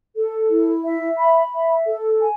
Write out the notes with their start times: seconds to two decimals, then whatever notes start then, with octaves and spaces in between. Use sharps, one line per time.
0.16 A4
0.50 E4
0.84 E5
1.18 B5
1.53 E5
1.86 A4
2.20 G#5